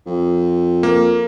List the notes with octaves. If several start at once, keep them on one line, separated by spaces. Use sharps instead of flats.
F2
A#3